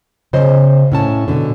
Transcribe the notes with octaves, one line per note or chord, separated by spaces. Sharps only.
C#3 C5 D#5
A2 C#4 A5
B2 D3